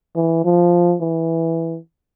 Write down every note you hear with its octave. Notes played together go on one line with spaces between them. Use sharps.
E3
F3
E3